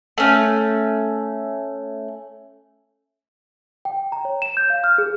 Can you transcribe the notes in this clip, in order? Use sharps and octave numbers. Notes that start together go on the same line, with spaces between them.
A3 C#4
G5
A#5
C#5
E7
G6
F5
F6
G#4